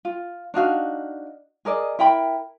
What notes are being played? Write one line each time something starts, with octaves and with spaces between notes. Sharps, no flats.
F4
D4 D#4 F#4 F5
G#4 A#4 D5 D#5
E4 A#4 G5 B5